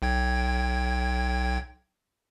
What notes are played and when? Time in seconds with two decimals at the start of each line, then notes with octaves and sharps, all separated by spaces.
0.02 B1 G5 G#6